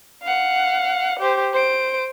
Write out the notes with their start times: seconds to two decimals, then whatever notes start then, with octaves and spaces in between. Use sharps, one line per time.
0.23 F5 F#5
1.19 G4 C5
1.53 C5 D7